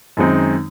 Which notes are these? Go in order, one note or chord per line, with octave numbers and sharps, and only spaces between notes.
F#2 D#3 G#3 C4 D#4